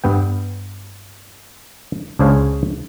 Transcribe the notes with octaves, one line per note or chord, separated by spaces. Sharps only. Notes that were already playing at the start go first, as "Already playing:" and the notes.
G2 B3 G5
C#2 D4 G#4 C5 C#5 F5